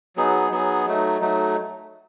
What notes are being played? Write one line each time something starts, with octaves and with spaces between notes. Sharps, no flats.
F#3 B3 D#4 G#4
F#3 B3 D#4 G#4
F#3 A3 D#4
F#3 A3 D#4